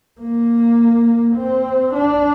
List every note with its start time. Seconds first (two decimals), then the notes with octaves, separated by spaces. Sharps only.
0.21 A#3
1.36 C4
1.94 D4